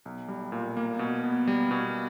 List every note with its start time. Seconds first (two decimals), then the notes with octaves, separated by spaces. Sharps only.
0.05 B1
0.28 G3
0.52 A#2
0.77 A#3
0.99 B2
1.24 B3
1.47 G3
1.71 B2